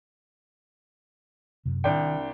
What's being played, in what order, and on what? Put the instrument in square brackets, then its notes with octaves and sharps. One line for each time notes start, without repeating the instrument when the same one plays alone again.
[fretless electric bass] F#2 C3
[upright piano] C2 D4 G5 [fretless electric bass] D#3